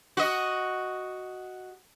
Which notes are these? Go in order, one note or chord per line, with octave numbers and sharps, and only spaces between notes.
F#4 D#5